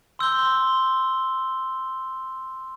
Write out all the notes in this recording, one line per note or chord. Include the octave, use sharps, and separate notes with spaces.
C6 E6 G6 G7